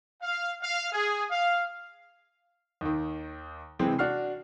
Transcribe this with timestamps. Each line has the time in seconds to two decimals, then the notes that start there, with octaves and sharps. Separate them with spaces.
0.21 F5
0.61 F5
0.92 G#4
1.31 F5
2.81 D#2 D#3
3.79 C3 E3 G#3 C4
3.99 D4 F#4 F6 C7